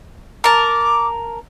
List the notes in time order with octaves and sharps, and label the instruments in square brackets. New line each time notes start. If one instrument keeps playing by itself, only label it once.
[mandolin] A#4 A5 [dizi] D6